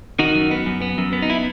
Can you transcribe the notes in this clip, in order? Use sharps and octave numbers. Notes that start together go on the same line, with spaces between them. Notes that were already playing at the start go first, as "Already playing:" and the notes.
D#3 D#4 F#4
F#2
B3
F#2
B3
F#2
B3
D#4
E4